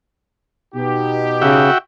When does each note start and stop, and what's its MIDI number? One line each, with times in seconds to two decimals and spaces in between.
0.75 1.67 47
0.75 1.67 63
0.75 1.67 67
1.42 1.70 49
1.42 1.78 66
1.42 1.78 76
1.42 1.78 79